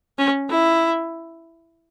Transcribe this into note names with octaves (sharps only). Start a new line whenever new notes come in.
C#4
E4